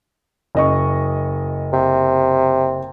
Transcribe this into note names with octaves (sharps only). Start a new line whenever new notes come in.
F#1 D#5 C#6
C3